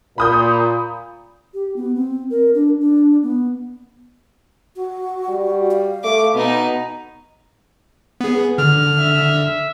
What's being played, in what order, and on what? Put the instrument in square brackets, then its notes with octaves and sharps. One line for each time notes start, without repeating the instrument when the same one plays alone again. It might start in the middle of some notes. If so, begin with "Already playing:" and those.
[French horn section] A#2 [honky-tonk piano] B5 D#6 G6
[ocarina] G4
B3
C4
A#4
D4
D4
B3
[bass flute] F#4
[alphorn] G3
[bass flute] F5
[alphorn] A3 [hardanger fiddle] D6
[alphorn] B2 [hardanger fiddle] B3 D#4
[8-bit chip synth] B3 G#4
[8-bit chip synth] D3 [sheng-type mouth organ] F6
[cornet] E5